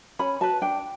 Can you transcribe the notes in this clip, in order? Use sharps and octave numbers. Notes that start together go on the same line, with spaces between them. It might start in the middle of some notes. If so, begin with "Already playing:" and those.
C#4 B5
F#4 B4 A5
D4 G5